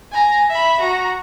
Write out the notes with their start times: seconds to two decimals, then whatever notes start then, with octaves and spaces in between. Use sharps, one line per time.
0.12 G#5 A#5
0.50 E5 B5
0.80 F#4 A#5